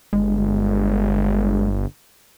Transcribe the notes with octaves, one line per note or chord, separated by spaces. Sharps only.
G1 G#3